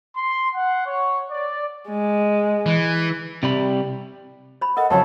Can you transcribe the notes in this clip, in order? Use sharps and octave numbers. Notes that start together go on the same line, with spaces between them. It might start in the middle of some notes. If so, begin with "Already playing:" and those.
C6
F#5
C#5
D5
G#3
E3
C3 G3 B5
C5 B5
A4 A#4 D#5 F#5
F2 C#3 F#3 A5